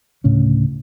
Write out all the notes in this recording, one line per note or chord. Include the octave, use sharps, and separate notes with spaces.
D2 A2 C#3 C#4